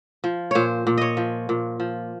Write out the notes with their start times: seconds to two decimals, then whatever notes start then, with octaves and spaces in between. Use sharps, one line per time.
0.24 F3
0.51 A#2 C5 C#5
0.87 A#2
0.98 C#5 D#5
1.17 F3
1.49 A#2
1.80 F3